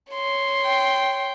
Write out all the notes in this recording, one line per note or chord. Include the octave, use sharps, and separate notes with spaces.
C#5 C6
G5